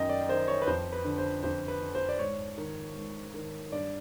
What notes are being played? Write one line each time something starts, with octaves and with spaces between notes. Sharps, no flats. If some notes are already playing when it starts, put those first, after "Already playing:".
Already playing: F#2 D#3 D#5 G5
D5
D#3 C5
C#5
B4
F2 C5
B4
D3
C5
F2 C5
B4
D3
C5
D5
G#2 C#5
D#3
G#2
D#3
G2 D5